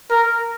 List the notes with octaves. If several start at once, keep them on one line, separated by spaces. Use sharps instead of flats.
A#4